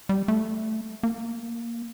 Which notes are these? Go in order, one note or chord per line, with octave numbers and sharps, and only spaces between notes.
G3
A3
A#3